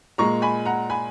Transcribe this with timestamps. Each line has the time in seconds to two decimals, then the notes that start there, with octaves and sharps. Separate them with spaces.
0.18 A#2 G#3 A#5 C#6
0.42 G#5 B5
0.65 F#5 A#5
0.90 G#5 B5